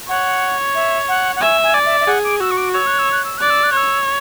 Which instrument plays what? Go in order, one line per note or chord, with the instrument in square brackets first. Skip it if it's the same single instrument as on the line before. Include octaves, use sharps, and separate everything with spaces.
[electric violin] C#5 [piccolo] F#5
[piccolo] E5
F#5
F#5
[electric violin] E5 [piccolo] G#5
[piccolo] G#5
[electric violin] D5
[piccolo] E5
E5
[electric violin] G#4 [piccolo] F#5
[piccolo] D6
[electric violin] F#4 [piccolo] E6
[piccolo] C#6
D6
[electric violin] C#5 [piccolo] E6
[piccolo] F#6
E6
F#6
E6
[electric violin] D5 [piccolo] F#6
[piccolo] E6
F#6
[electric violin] C#5 [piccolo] E6